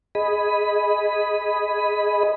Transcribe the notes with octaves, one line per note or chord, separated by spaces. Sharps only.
G#4 D#5 B5